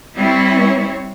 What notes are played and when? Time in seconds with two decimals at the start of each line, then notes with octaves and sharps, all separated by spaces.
0.16 G3 C4 E4 C#5